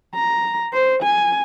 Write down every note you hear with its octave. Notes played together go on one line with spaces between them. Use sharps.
A#5
C5
G#5